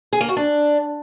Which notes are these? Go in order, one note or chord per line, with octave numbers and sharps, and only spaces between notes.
G#4
A#3
F#4
D4